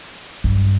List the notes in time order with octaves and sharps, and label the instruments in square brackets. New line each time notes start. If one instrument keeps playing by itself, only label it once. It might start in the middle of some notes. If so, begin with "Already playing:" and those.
[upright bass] G2